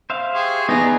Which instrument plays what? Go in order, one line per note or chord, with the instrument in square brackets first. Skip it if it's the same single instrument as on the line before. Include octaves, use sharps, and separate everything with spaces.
[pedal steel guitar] C5 E5 F5
[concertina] G4 C6 C#6 [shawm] G#4
[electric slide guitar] B3 G#4 [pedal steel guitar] D4 D#4 [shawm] A#5